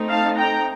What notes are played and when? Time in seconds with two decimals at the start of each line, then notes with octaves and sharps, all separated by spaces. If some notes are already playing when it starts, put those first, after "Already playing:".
Already playing: A3 C4 D#4
0.09 F5 A5
0.37 G5 A#5